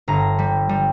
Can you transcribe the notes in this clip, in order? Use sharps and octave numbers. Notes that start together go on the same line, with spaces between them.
G1 A#5
G3
G3